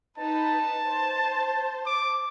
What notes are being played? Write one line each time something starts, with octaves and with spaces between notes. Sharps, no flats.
D#4 B4 A5
C5
D6